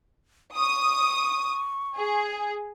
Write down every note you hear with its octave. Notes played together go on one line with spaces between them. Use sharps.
C#6 D#6
G#4